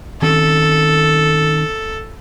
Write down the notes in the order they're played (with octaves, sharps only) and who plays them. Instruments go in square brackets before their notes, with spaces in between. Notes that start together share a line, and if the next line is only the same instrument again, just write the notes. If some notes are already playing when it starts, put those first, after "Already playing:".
[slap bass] D#3 C4 C#4 [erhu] A4